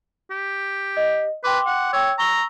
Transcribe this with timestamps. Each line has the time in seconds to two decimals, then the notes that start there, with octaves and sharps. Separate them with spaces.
0.30 G4
0.97 D#5
1.44 B4 G5 C6 D6
1.66 F#5
1.93 C#5 G5 E6
2.18 A#5 C#6 E6 G7